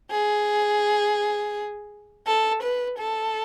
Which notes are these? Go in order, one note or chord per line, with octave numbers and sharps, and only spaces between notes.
G#4
A4
B4
A4